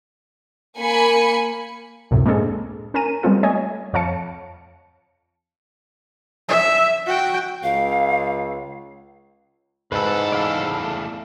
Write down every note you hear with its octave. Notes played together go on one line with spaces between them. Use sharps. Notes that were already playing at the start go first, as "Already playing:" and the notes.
A#3 G#5 B5 C#7
C#2 F#2 A2 C3
G#3 A#3 C4 D4 G#4 A4
C#4 A#4 G#5 A#5 D#7
G3 G#3 B3 C4 F4 A4
A3 C#5 D#5 G#5
F2 C#5 F5 A5 C#7
E5
F#4 G5
C#2 F5
E2 G#2 A4 B4
D5 F5 B5
A3